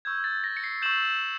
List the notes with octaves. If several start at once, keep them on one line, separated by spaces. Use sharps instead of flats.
C#6 E6 G6 G#6
A6
A#6
C#7
C7
C#6 E6 G6 E7 F#7